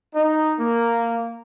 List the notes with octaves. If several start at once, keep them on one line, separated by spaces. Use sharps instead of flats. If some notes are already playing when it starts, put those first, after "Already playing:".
D#4
A#3